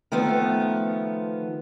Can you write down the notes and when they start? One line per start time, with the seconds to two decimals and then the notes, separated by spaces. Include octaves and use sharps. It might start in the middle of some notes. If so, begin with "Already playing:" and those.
0.12 D#3 F3 A3 B3